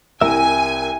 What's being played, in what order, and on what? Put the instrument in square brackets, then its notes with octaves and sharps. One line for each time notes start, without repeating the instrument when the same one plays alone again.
[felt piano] C2 [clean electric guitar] A#4 E5 [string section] G#5